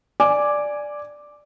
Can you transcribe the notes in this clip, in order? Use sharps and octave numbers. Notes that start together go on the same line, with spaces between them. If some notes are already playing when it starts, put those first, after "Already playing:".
D5 G#5 D6